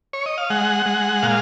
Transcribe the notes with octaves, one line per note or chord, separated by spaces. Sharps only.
C#5
D#5
F5
G#3 F#5
G#3
A#2 F5